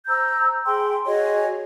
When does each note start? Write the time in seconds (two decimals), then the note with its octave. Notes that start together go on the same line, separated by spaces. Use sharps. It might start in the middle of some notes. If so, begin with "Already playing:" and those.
0.07 C5 A#5 E6 G6
0.66 G#4 G5 B5 C6
1.06 F#4 G#4 C#5 D#5